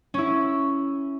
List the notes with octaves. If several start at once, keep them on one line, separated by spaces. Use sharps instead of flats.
C#4 E4